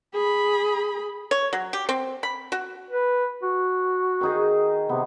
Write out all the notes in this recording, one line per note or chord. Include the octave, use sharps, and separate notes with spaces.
G#4 B5
C#5
F#3
G4
C4
B5
F#4
B4
F#4
D#3 D#4 G#4
C3 B3